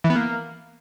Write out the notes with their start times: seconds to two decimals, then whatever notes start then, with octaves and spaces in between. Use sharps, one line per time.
0.04 E3
0.10 B3
0.15 A#3